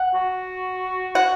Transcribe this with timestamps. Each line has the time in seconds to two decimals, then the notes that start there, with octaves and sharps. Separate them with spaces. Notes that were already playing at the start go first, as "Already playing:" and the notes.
Already playing: F#5
0.14 F#4
1.15 F#5